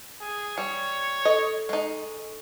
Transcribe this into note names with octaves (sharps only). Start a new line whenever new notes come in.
G#4
G3 C#5
A4 D#5 C#6
G#3 D#4